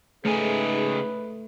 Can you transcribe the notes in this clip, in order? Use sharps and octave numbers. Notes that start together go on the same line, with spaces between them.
G#2 C#3 A3 D#4 G#4 B4 G#5